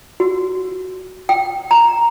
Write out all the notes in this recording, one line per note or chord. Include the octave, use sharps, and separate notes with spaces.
F#4
G5
A#5